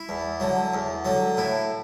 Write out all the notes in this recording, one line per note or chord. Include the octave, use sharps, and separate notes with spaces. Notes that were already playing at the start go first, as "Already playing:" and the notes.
Already playing: E4
E2
D3 F#3
E2
D3 F#3
A2 E4